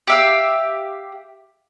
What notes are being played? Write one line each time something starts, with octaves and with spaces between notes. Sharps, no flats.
G4 E5 F5